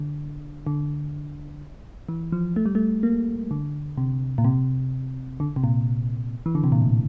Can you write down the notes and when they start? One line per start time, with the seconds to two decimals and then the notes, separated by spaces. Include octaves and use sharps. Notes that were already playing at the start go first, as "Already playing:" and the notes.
Already playing: D3
0.67 D3
2.09 E3
2.32 F3
2.56 A3
2.66 G3
2.75 A3
3.03 A#3
3.51 D3
3.98 C3
4.38 A#2
4.45 C3
5.40 D3
5.56 C3
5.64 A#2
6.46 E3
6.55 D3
6.64 C3
6.72 A#2
6.81 A2